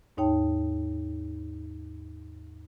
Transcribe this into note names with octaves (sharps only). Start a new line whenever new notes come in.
D#2 G#2 D#4 C#5 G5 A5